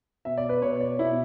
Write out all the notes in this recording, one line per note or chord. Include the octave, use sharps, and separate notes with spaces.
B2 E5
D5
B4
B2 C#5
D5
B2 E4